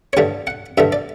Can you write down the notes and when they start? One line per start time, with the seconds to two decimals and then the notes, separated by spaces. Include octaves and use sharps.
0.13 C#5
0.17 G2 D3 A3 D5
0.47 F#5
0.78 G2 D3 A3 E5
0.93 D5